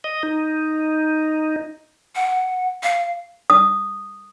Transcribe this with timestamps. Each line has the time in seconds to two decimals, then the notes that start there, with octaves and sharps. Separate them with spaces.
0.04 D#5
0.23 D#4
2.15 F#5
2.83 F5
3.50 D#6